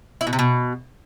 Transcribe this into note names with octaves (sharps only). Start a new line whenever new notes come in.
E4
B2
C3
B2